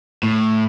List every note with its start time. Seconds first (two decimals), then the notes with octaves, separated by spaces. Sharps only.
0.23 A2